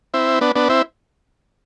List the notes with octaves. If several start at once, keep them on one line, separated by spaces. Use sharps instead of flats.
C4 E4
B3 D4
B3 D4
C4 E4